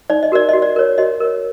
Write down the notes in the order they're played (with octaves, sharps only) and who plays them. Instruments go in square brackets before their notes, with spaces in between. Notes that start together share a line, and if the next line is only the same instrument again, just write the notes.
[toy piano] D#4 D5
D#5
F#4 A#4 D5
F#4 D#5
D5
A#4 C#5
F#4 D#5
A#4 C#5